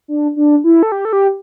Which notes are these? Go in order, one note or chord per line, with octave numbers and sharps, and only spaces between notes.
D4
D4
E4
A4
G4
A4
G4